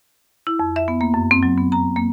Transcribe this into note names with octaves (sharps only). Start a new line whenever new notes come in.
E4
F2
E5
B3
A#3
F#2
C4
F#3
B3
A#5
A#3